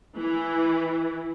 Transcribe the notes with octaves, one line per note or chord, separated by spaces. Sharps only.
E3